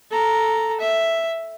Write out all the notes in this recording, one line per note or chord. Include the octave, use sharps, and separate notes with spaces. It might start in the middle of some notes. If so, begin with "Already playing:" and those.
A4 A#5
E5